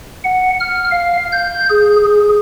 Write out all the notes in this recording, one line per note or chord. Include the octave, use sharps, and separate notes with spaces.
F#5
F6
F5
G6
G#4
G#4